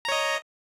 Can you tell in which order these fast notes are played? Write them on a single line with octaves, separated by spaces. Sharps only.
A#5 C#5 D#5